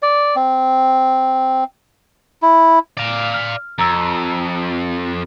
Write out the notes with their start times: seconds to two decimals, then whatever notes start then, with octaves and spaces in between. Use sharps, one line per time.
0.02 D5
0.36 C4
2.42 E4
2.97 D5 F5
3.34 F6
3.79 F2 A#5 E6